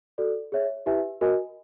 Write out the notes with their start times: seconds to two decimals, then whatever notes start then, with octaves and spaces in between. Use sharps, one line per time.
0.18 F#4 A4 D5
0.52 G#4 C#5 E5
0.86 E4 G4 B4 E5 G#5
1.21 F#4 A#4 D#5 G#5